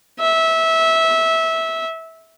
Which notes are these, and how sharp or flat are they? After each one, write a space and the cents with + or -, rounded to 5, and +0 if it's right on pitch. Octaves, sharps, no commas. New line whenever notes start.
E5 -20